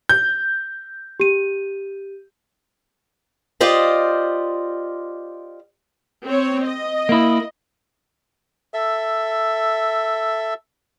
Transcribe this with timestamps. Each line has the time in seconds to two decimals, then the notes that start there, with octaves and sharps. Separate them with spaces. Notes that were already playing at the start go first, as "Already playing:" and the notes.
0.09 G6
1.20 G4 D#7
3.61 F4 G4 C5 D5 D#5
6.25 C4 C#5
6.64 D#5
7.09 A#3 E4
8.74 A4 E5